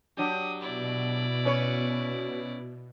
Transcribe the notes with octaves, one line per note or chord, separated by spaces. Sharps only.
F#3 D4 G4 D#6
B2 E4 D5
C#4 B4 C#5